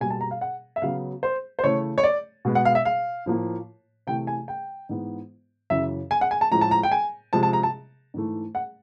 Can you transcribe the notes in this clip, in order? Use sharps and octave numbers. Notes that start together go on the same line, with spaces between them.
B2 G3 A#3 G#5
A5
A#5
F5
F#5
E5
C#3 F#3 B3 F5
C5
C5
C#3 E3 A3 C#5
C#5
D5
B2 G#3 B3
F#5
F5
E5
F5
A2 F3 A#3
C3 E3 A3 G5
G#5
G5
G#2 E3 G#3 B3
F#2 C#3 E3 E5
G#5
F#5
G#5
A5
A2 F3 G#3 A#5
A5
A#5
G5
G#5
C3 F3 G#3 A5
A5
A#5
A5
G#2 E3 A3
F#5